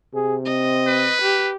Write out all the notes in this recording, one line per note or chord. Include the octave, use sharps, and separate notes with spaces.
C3 G#4
C4 D#5
B4
G4